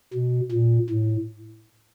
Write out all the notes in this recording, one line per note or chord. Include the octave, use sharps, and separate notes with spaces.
B2
A#2
A2